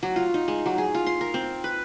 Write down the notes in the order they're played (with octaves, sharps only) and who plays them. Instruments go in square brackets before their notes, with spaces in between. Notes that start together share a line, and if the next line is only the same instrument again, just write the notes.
[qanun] F#3
F4
D#4
G#3
F#3
G#4
F4
C6
A#4
C4
B4